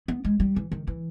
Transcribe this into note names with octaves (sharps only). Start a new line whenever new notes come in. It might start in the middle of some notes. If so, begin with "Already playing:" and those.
B3
G#3
G3
E3
D#3
E3